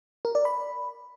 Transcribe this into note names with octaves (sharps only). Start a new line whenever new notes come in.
A#4
D5
B5